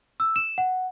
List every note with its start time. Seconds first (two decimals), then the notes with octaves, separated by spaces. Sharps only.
0.20 E6
0.36 E7
0.58 F#5